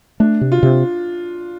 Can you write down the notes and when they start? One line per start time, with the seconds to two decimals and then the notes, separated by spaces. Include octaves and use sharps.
0.20 A3 D4
0.41 C3
0.52 F4
0.63 C3